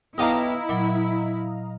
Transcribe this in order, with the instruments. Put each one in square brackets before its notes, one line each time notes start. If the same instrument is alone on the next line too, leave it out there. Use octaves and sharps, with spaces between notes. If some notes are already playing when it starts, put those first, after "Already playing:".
[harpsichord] B1 G4 A5 [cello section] E4 [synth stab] D#5 F5 A#5
[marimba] A#2 F#3 [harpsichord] B5